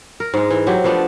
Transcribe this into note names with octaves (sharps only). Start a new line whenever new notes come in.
A#4
G#2 G#3
E3
F#3 C4 G4
F3 A3 B3 D4